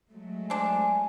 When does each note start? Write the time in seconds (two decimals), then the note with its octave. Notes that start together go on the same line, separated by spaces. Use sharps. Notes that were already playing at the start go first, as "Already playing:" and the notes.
0.11 F#3 G#3 A3
0.50 C4 D4 G#5